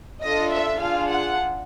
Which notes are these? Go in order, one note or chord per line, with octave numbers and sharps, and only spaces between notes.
D4 F4 A4 D#5
E5
D4 F4 G#4 F5
F#5